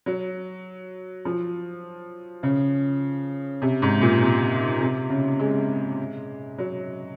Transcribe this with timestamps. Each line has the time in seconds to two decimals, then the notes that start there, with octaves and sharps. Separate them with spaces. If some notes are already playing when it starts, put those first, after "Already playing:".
0.06 F#3
1.25 F3
2.43 C#3
3.62 C3
3.82 G#2
4.01 A#2
4.21 C3
4.81 C3
5.10 C#3
5.39 G#3
6.58 F#3